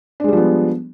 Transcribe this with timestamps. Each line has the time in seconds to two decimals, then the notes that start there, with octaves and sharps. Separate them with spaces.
0.20 D4
0.24 G#3
0.28 G3
0.33 F3
0.37 B3